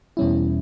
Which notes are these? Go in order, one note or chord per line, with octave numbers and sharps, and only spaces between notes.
E2 B2 G3 C#4 E4